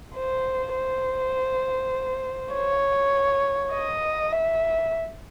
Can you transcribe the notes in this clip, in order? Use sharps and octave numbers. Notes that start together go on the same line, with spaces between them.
C5
C5
C#5
D#5
E5